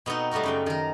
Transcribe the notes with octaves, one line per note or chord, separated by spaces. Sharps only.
B2 B3 C4 D#4
G3 A3 B3 F#4 A#4
F#2 C#3 G5
D#3 A#4